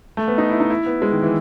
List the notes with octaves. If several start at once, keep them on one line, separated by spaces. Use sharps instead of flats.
A3
B3
D#4
E4
D#4
E4
B3
G#3
D#3
E3